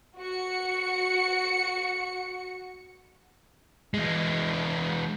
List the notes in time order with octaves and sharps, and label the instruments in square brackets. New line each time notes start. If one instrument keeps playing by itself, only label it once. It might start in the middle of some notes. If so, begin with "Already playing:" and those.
[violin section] F#4 C#7
[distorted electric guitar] E3 G#3